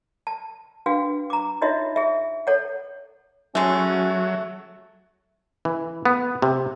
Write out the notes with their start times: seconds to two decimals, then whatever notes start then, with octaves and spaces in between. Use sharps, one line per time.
0.27 A5
0.86 D4 F#4 B4 F5 G5
1.30 A#5 D6
1.62 D#4 F4 F#4 C#5 D#5 E5
1.96 G#4 E5
2.47 A4 C#5 F#5
3.55 F#3 G#3 A3 C#4 F#4
5.65 E3
6.05 B3
6.42 C3